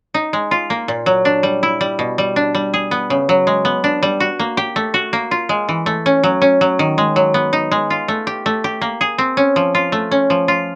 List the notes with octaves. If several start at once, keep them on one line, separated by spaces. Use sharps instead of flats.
D#4
G#3
F4
A#3
A#2
F#3
D4
G3
E4
G3
B2
G3
D4
G3
G#4
B3
C#3
F#3
G#3
B3
D4
G3
F#4
A#3
G4
A3
F#4
A#3
F4
G#3
E3
A3
C#4
F#3
C#4
F#3
D#3
G#3
F#3
B3
D#4
G#3
F4
A3
G4
A3
G4
A#3
G#4
C4
C#4
F3
F4
A3
C#4
F3
F4